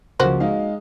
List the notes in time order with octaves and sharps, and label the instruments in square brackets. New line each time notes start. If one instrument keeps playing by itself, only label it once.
[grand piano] C#2 F3 [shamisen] A#3 F#4 C5
[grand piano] G#3 D#4 F5